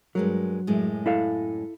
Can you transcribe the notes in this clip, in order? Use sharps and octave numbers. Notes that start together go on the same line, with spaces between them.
G2 F#3 G#3 A#4
F#2 A2 G#3
E4 A4 F5